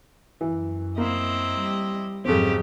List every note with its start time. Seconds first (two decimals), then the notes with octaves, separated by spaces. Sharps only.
0.41 F#2 E3
0.98 A#3 C4 E4 D#5
1.57 G3
2.25 F2 G#2 C#3 F#3 C4 G4 A4